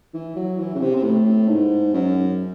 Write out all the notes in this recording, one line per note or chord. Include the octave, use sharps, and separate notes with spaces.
E3
F#3
E3
C#3
C3
C3
A2
G#2
F#2